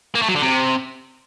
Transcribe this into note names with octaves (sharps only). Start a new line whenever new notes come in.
A#3
A3
F#3
D3
C3